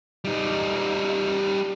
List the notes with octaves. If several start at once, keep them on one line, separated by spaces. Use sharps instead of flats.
G3 D#4